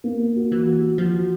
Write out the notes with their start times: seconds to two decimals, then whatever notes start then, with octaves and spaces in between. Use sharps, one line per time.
0.04 A#3
0.36 F#4
0.52 E3
0.67 F#4
0.98 F3 F#4